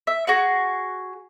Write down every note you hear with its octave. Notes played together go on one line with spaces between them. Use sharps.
E5
F#4 G#4 F#5